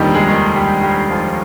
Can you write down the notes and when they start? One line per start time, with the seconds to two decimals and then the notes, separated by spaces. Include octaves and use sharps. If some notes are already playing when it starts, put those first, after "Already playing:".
Already playing: F1 D#2 D3 D#3 F3 G3 D#4 G4
0.15 G#3 G#4
0.28 D#3 D#4
0.56 G3 G4
0.83 G3 G4
1.10 F3 F4